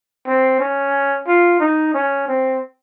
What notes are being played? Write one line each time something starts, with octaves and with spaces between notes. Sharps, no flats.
C4
C#4
F4
D#4
C#4
C4